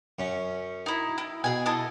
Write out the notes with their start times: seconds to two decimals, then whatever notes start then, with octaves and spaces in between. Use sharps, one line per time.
0.19 F#2 C#4
0.86 D#4 E4
1.18 E4
1.44 B2 G#4 G#5
1.66 E4 A4 D#5